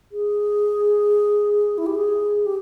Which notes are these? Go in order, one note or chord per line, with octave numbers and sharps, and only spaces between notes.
G#4
E4
G4
G#4
G4